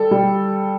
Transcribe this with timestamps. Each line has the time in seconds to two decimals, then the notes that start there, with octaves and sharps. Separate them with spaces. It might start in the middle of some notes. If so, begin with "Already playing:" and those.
Already playing: G3 A4
0.11 G3